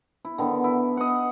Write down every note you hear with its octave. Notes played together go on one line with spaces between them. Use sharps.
E4
D3 D#3 B3
E4
D#5 F#5